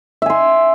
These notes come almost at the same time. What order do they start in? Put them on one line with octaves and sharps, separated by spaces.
E5 G#5 C6